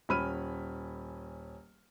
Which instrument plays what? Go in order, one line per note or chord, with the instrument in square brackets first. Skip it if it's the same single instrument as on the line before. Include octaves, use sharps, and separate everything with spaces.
[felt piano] D#1 C#4 B5 F6 D#7